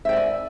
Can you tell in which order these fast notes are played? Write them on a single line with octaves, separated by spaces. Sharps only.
E5 G5 D5 G#5